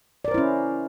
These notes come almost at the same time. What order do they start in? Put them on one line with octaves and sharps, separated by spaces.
D5 A#4 C5 E4 C#4